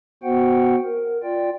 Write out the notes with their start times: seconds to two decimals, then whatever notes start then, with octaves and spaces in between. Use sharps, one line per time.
0.23 B3 F#4 C5 F#5 G5
0.85 A#4
1.23 F4 D5 G5